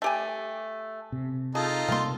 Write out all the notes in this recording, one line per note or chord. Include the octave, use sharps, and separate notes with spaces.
A3 G4 G#5
C3
D#4 F4 G#4 A4
C3 G3 A#3 F5 C6